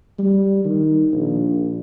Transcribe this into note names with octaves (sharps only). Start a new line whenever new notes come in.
G3
D#3
A#1